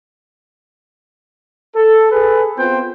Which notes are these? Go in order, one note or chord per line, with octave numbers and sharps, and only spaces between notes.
A4
G#4 A4 B4
B3 C4 F4 C5 G5